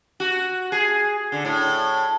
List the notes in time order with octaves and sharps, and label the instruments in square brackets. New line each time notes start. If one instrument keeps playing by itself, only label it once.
[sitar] F#4
G#4
D3
A2